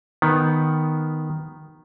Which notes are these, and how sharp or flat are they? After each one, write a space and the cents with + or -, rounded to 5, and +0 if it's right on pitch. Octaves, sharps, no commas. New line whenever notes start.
D#3 +0 B3 +0